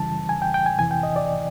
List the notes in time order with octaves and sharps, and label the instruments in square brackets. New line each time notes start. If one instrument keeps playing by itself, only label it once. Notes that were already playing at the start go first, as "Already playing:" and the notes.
Already playing: [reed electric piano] F#2 C#3 E3 G3 A5
G#5
G5
G5
G#5
F2 C3 E3 G#5
G5
D#5
D5